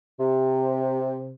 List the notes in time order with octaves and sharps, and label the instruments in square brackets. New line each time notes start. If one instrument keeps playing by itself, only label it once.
[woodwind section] C3